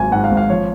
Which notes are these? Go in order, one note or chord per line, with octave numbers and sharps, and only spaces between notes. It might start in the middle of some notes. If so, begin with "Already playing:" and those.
Already playing: G#1 F#3 G#5
G#2 F#5
F5
G#1
F5
F3 C#5